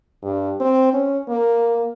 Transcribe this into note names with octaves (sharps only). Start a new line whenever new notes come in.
G2
C4
C#4
A#3